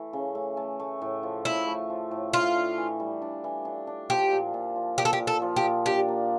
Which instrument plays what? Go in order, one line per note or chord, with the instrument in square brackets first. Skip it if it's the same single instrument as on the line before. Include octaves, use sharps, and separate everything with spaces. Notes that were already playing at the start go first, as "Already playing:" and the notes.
Already playing: [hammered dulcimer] E3 A3
C#3
A3
A3
A3
A2
F3
[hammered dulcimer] A2 [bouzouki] E4
[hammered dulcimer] A3
F3
A2
[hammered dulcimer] D4 [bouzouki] F4
[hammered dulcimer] D4
E3
G3
D4
E3
D4
D4
[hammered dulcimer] F3 [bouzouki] G4
[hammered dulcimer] A#2
A#2
F3
[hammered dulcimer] A#2 [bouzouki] G4
[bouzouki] A4
G4
[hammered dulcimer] A#2
[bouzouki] A4
[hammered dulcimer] F3
[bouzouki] G4
[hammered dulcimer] A#2
[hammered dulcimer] D4 [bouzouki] G4
[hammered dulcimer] A#3